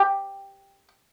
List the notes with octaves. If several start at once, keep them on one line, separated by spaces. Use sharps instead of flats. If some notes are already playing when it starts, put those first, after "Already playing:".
Already playing: G4